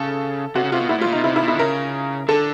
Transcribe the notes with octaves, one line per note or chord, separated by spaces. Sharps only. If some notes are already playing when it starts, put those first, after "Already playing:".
Already playing: C#3 A4
C3 F#4
C#3
C3 F4
B2
A#2 E4
A2
F4
A#2
B2 D#4
C3 E4
E4
B2
E4
D3
C#3 A#4
D3 A4